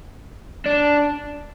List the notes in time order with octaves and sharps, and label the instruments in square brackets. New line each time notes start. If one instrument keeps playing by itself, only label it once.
[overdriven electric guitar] D4